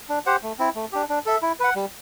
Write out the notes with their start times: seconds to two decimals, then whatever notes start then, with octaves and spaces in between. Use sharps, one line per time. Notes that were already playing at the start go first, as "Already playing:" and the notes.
0.09 D4
0.26 G4 C5 F#5
0.43 A3
0.59 C4 E4
0.75 A3
0.92 D4 G4
1.09 D4
1.26 A4 E5
1.42 E4
1.60 B4 F#5
1.75 G3